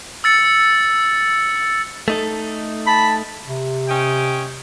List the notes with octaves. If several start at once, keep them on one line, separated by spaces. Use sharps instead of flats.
E6 A6 C#7
A3 D#4 A4
A5 B5
C3
C#4 D#5 G5